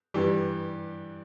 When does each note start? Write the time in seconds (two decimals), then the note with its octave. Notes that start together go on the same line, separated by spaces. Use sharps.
0.14 G2 E3 G3 G4